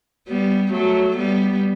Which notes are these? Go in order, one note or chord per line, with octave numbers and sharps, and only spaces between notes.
G3 B3
F#3 A3
G3 B3